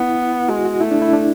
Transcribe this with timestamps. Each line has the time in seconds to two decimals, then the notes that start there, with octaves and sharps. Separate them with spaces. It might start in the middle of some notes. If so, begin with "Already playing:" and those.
Already playing: B3 E4
0.49 G#3 F#4
0.65 F#4
0.80 A3 E4
0.91 D4
1.02 E4
1.13 D4